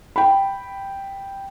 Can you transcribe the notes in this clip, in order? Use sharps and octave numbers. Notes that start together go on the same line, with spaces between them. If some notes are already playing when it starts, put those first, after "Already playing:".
G5 B5